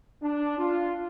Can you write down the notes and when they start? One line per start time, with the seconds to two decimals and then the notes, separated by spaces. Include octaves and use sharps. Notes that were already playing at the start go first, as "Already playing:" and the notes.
0.22 D4
0.58 F4